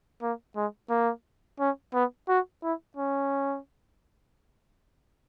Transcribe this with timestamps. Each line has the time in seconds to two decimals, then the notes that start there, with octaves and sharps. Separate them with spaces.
0.22 A#3
0.56 G#3
0.90 A#3
1.60 C#4
1.94 B3
2.29 F#4
2.63 E4
2.97 C#4